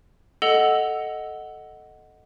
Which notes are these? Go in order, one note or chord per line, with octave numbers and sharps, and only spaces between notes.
A4 D#5 F#5 E6 F7 G7